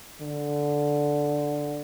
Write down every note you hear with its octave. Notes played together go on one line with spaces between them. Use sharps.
D3